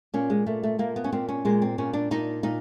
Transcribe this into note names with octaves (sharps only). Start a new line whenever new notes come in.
A#2 C#4
G#3
A#2 A3
A3
A#2 A#3
B3
C#4
A#2 C4
C#4
A#2 G#3
C4
A#2 C#4
D4
A#2 D#4
A#2 D#4